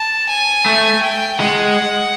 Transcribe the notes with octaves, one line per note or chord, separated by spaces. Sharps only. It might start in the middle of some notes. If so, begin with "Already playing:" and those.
Already playing: A5
G#5
A3
G5
G#3 F#5